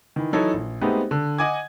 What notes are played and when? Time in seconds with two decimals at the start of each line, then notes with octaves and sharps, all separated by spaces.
0.16 D#3 E3
0.33 E3 F#3 D#4 E4 A4 C#5
0.54 A#1
0.81 G#3 A3 B3 C4 D#4 G4
1.11 D3
1.38 D#5 F#5 G#5 D6 G#6